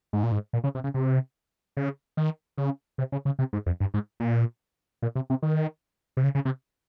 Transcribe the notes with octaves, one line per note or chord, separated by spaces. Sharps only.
G#2
A#2
G#2
A#2
C#3
C3
C#3
C3
C#3
D#3
C#3
C3
C#3
C#3
C3
G#2
F2
G2
G#2
A#2
A#2
C3
C3
D#3
C3
C#3
C#3
C3